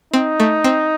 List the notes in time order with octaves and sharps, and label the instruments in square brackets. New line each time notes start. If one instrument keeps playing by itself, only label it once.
[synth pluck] C4 [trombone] D#4
[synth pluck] A3
C4